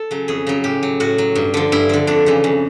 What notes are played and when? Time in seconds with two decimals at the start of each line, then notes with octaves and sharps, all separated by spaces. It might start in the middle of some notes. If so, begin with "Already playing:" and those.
Already playing: A4
0.11 C#3 F#3
0.28 F2 G#4
0.47 C#3 F#3
0.64 A2 G4
0.83 F#3
1.00 A2 F#4
1.18 F#3
1.35 G2
1.54 D3 F3
1.72 G2 E4
1.89 D3 F3
2.07 F2 D4
2.26 C#3 E3
2.44 F2